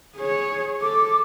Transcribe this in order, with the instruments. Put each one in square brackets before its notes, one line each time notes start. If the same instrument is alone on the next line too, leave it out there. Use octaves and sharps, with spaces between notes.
[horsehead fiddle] G#4 C#5
[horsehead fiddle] A4 [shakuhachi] D6